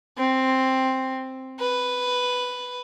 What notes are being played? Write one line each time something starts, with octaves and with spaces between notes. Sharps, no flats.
C4
B4